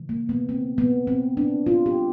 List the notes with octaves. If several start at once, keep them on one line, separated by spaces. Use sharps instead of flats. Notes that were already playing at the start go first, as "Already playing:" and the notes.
Already playing: C#3 E3 G#3
A#3
B3
C4
B3
C4
D4
F4
G4